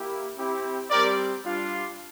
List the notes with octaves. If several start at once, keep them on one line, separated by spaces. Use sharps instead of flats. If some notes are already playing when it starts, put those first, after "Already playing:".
Already playing: A#3 E4 G4
C4 E4 G4
G3 C4 G4 A#4 D5
G3 D4 F4